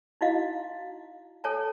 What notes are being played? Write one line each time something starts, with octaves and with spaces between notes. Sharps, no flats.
D#4 E4 F#4 D#5 F5
A4 C#5 G#5 A5